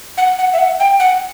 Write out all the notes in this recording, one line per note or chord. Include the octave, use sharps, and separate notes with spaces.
F#5
F#5
E5
F#5
G5
F#5